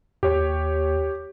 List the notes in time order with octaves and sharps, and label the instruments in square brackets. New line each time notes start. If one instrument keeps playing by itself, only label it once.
[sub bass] D#2 [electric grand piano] G4 C#5